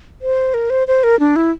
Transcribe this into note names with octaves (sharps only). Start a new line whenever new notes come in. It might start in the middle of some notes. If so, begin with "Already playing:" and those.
C5
A#4
C5
C5
A#4
D4
E4